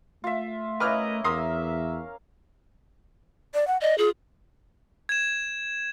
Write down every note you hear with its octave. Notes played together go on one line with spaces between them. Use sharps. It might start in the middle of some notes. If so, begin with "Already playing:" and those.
A3 F4 E5
C#4 E4 A#4 B4 D#5 D6 F6
E2 A#4 E5 F5 C6 D#6
D5
F#5
D5 D#5
F4 G#4
G#6 E7